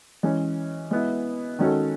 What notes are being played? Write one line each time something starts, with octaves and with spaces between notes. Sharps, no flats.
E3 G#3 C#4
G#3 B3 E4
D#3 G#3 C#4 F#4 A4